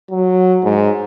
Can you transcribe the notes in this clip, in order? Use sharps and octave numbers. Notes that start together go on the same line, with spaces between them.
F#3
G#2